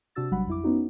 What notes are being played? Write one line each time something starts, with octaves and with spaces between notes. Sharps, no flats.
C3 D4 F#4 E6 A6
A1 F#3 G3 F#5 B5
F2 E4 D6
B3 C#4 D#4 F#4